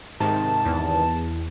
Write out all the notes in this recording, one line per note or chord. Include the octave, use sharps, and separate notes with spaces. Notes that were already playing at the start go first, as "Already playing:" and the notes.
G#2 C3 D#3 A5
E2